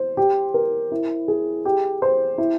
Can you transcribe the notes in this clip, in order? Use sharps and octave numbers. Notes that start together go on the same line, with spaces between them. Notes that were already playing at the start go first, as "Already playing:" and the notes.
Already playing: C5
G4
A#4
E4
G#4
G4
C5
E4